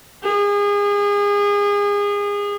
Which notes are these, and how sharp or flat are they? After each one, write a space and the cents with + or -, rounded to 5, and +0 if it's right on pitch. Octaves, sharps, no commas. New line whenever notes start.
G#4 -30